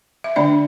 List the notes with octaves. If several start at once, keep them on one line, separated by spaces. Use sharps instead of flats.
E5
D3 A3 D4 D5